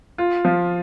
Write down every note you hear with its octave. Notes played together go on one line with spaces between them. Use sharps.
F4
F3